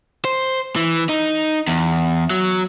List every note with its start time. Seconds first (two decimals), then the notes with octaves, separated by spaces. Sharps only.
0.25 C5
0.76 E3
1.09 D#4
1.68 E2
2.30 F#3